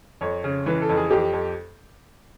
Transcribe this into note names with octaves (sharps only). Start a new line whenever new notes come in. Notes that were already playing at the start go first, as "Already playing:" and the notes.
F2 C#5
C#3
E3 B4
A4
F2
G#4
F2 G4
F2